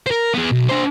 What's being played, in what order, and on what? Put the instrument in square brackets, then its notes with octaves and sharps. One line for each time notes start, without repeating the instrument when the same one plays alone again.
[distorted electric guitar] A#4 C5
B3 G#4
B1
D4 C5